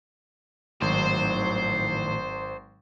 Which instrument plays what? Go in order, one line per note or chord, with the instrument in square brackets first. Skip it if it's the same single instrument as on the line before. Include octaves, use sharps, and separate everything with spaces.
[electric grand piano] G#1 [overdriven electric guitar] A2 D#3 [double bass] F#3 [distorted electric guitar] C5